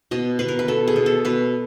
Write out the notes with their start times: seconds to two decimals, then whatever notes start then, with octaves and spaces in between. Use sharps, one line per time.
0.11 B2 D#5
0.39 B2 B4
0.48 A#4
0.59 B4
0.68 B2 A4
0.88 G#4
0.96 B2
1.06 A4
1.25 B2 B4